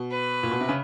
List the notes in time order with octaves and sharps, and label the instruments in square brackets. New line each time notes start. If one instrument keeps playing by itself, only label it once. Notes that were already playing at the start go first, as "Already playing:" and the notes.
Already playing: [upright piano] B2
[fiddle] B4
[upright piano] A#2
B2
C3
C#3